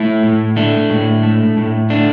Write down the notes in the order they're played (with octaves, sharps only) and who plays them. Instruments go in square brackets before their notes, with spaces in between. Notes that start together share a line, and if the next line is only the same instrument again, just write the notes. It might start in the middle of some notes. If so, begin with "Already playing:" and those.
Already playing: [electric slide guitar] A3 E4
A2
A3 D4
A2
A3
A2
A3 D4